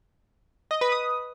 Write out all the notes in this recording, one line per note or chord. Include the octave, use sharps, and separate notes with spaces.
D#5
B4
D#6